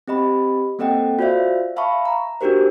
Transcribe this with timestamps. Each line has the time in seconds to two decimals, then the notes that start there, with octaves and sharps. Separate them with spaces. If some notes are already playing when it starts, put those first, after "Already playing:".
0.08 C4 G4 D#5 B5
0.79 A#3 C4 A4 D#5 F#5 G5
1.19 F4 F#4 C5 D5 E5 F5
1.76 E5 F5 A5 B5 C#6
2.05 A#5
2.41 D4 D#4 F#4 G4 A#4 C5